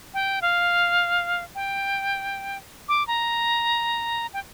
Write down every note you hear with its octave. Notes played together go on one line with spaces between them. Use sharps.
G5
F5
G5
D6
A#5
G5